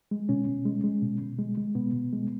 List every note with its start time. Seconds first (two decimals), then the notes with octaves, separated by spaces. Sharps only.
0.11 G#3
0.29 B2 C#4
0.47 B2
0.65 G#3
0.84 G#3
1.02 B2
1.21 B2
1.39 G#3
1.58 G#3
1.75 B2 B3
1.93 B2
2.13 G#3